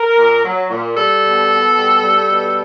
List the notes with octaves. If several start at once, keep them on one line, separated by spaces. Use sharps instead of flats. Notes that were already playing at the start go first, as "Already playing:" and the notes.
Already playing: A#4
A#2
F#3
A#2
G3 A4
B2
B2
G3
G3
B2